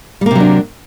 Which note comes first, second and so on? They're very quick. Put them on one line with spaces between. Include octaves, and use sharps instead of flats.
G3 A#3 C3 F#3 D4